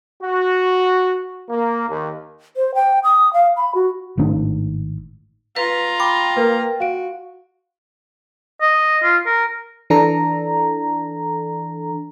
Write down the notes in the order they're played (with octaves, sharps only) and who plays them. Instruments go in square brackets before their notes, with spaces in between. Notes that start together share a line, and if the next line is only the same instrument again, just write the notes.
[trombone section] F#4
A#3
D#2
[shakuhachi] C5
G5
D#6
F5
B5
F#4
[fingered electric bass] G#1 A2 D#3 D4
[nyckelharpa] F4 A#5 [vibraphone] B4
[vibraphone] G5 [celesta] B5 D6
[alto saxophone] A#3 [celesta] A#4 B4
[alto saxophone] F#4 [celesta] F5 D7
[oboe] D#5
F4
A#4
[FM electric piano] E3 D4 A4 A#5